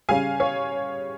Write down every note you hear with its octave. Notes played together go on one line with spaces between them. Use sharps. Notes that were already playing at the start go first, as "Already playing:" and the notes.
C#3 G3 C#4 F5 G#5
C#5 F5